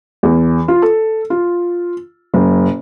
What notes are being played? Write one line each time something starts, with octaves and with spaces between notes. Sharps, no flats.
E2
F4
A4
F4
F#1